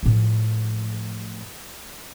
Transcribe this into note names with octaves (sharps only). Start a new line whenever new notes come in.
A2 F3